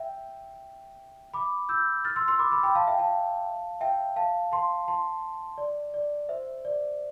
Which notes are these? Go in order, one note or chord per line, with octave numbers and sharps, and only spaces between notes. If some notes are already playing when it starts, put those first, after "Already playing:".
Already playing: E5 G5
B5 D6
E6 G6
F6 A6
C6 E6
C6 E6
B5 D6
B5 D6
G5 B5
F5 A5
E5 G5
F5 A5
E5 G5
F5 A5
A5 C6
A5 C6
D5
D5
C5 E5
D5